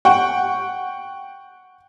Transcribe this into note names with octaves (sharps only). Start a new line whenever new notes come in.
F#5 G5 C#6